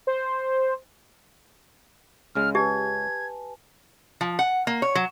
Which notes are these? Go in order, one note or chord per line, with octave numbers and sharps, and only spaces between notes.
C5
C#2 C#3 G#3 F6
G4 B4 G#5 A5 G#6
F3
F#5
A#3
C#5
F#3